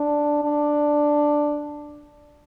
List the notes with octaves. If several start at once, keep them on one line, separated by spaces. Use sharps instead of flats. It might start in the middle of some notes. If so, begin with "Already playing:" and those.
Already playing: D4
D4